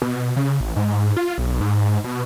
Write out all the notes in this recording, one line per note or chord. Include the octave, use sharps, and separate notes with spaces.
B2
C#3
A1
G#2
F4
B1
G#2
B2